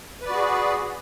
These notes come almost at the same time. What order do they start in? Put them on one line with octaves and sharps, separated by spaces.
B4 D5 F#4 G#4